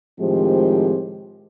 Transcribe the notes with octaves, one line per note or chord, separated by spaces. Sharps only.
A2 D#3 F3 G#3 C4 G4